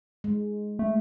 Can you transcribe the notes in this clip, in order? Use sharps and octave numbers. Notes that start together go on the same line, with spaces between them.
G#3
A3